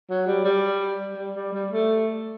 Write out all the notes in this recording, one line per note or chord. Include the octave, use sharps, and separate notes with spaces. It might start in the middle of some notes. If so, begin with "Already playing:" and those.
F#3
G3
G3
G3
G3
G3
A3